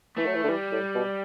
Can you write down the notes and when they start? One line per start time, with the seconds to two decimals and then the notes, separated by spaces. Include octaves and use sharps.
0.17 E3 A3
0.26 F#3
0.34 E3
0.44 D3
0.48 E3 G3
0.71 A2
0.95 B2